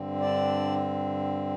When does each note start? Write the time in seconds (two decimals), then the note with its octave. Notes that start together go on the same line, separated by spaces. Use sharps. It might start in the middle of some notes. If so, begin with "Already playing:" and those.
Already playing: G2 D3 C4
0.21 D4 D5